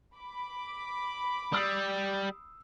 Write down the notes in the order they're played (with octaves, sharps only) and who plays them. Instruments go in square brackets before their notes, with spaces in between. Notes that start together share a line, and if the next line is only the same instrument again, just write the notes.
[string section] B5 D6
[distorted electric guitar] G3 [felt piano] D#6 E6 C7